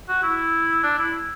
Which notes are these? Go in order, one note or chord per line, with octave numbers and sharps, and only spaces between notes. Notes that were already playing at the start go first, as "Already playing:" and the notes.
F#4
E4
D4
E4